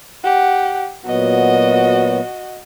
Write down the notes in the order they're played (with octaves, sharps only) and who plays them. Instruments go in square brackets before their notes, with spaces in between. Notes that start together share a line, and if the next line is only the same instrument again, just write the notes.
[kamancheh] G4 F#5
[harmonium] A#2 F#3 B3 [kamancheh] F#4 D#5